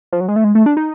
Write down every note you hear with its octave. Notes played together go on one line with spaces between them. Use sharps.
F3
F#3
G#3
A3
G#3
A3
D4
D#4